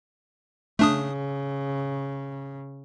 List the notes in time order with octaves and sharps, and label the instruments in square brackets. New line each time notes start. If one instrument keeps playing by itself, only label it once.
[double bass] C#3 [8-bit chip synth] A3 D4 D#6